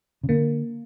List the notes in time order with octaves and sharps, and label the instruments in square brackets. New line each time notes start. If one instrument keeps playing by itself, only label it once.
[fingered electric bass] C#3
[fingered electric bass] D3 [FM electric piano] A#3